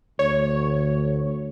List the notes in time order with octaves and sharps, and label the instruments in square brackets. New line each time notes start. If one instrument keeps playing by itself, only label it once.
[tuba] D2 [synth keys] C#5